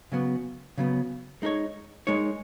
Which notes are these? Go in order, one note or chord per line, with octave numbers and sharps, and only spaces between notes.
C#3 F#3 B3
C#3 F#3 B3
G#3 D#4 A#4 C#5
G#3 D#4 A#4 C#5